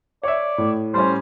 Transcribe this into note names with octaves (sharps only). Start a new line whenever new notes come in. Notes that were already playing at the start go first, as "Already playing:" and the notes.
C#5 D5 E5
A2
G3 C#4 C5